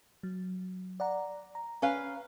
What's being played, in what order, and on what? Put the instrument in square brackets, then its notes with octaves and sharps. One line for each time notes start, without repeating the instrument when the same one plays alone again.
[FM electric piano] F#3
D5 F#5 A#5
A#5
[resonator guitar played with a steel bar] C#4 B4 F5